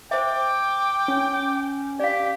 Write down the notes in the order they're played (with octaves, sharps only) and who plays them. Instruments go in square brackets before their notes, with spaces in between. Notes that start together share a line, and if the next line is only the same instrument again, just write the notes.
[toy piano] C5 E5 [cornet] G5 [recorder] D6
[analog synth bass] C#4
[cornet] G4 [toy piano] D5 F5